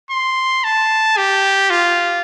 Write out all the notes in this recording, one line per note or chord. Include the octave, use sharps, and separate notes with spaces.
C6
A5
G4
F4